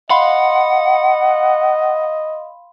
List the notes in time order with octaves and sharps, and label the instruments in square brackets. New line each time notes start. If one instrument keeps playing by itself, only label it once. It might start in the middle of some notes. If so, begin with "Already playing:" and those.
[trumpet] D#5 [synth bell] F5 B5 C6 [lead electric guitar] F#5